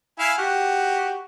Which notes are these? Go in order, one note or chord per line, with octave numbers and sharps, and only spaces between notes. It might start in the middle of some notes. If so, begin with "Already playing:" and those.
E4 F5 G#5
F#4 G4